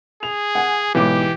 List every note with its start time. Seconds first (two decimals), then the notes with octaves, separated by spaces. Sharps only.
0.23 G#4 F7
0.55 F#5 G#5
0.95 B1 G#2 E3 G4 D6